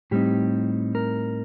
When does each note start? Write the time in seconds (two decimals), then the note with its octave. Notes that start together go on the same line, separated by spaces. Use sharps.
0.11 A2 G3 C4 D#4 G4
0.95 A#4